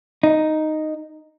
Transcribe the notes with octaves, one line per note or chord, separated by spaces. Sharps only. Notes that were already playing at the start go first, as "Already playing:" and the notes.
D#4